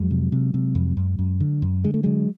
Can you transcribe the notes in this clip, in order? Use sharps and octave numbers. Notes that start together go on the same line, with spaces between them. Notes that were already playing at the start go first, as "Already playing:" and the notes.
Already playing: F2 F#3 G#3
C3
C3
C3
F2
F#2
F#2
D3
F#2
D3 G#3
A3
D3 F#3 G#3